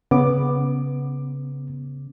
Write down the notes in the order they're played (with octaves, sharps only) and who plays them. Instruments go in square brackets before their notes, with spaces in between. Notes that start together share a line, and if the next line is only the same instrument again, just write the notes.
[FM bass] C#3 [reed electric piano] B3 D6